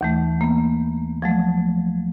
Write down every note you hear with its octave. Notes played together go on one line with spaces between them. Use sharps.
D#2 E3 A3
A#3 B3
F3 F#3 A3